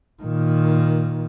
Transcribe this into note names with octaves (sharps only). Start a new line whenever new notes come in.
A#2 D#3